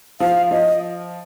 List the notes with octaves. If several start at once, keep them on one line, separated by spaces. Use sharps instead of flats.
F3 F5
F3 D#5